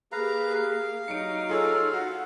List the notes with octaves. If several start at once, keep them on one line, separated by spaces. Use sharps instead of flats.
A#3 G4 G#4 B4 F5 A#5
F5
F#3 D#4 C#7 D7
F4 G#4 A4 C#5
F#4 F#5